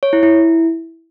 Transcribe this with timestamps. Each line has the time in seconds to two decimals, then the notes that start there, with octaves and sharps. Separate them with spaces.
0.03 C#5
0.13 E4
0.23 E4